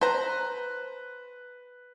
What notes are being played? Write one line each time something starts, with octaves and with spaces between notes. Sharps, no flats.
B4 C5 A#5